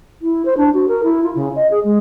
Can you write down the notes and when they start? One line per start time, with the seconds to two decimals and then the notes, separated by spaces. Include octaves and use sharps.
0.22 E4
0.45 C5
0.57 D4
0.74 F#4
0.88 A#4
1.03 E4
1.23 F4
1.35 C#3
1.56 D#5
1.71 G#4
1.84 G#3